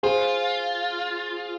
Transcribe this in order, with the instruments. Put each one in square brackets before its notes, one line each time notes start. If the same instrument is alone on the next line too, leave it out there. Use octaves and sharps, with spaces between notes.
[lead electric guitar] F4 [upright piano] G#4 C5